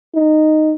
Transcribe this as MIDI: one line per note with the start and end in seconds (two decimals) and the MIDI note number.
0.15 0.75 63